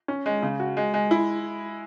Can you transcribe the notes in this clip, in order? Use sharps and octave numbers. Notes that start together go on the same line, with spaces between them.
C#4
G#3
C#3
F#4
G#3
G#3
E4